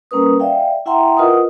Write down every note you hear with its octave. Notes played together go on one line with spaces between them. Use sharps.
G3 A#3 C#4 A#4 B4 D#6
D5 E5 F5 G5
E4 E5 F#5 G5 A#5 C6
F4 A#4 B4 D#5 F#5 D#6